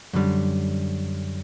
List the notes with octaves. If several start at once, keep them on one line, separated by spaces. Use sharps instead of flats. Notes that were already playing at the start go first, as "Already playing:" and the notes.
F#2 D3 G3